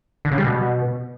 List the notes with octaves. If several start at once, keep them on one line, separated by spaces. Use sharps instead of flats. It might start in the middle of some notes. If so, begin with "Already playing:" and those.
D3
C#3
G3
B2